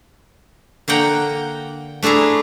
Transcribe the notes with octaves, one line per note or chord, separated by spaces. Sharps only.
D3 A#3 F#5 G5 A#5
A3 D4 E4 G#4 A#5